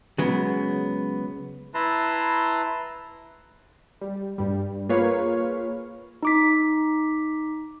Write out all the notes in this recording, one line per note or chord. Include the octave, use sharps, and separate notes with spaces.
C#3 F#3 G#3 B3
E4 B4 A5 A#5 C6
G3
G2 G3
A#3 F4 G#4 B4 C#5 F5
D#4 D6 B6